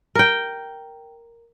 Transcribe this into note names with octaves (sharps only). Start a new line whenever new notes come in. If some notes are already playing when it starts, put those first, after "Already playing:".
A#4 G5